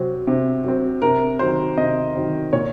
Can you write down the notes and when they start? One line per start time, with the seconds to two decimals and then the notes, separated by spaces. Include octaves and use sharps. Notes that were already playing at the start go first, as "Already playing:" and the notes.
Already playing: C3 F#3 C4
0.27 C3
0.64 F#3 C4
1.02 C3 A#4
1.39 D#3 F#3 C4 C5
1.78 C3 D#5
2.15 D#3 F#3 C4
2.53 A#2 C#5